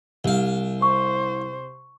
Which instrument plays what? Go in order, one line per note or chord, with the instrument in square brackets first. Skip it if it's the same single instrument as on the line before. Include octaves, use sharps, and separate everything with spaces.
[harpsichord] C2 F5 [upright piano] C3
[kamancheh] C5 [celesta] C#6